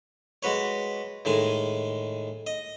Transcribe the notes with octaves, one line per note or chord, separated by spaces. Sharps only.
G#3 F#4 B4 C#5
A2 D#3 G#3 G#5
D#5